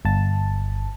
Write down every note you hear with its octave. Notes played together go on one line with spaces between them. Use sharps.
G1 A5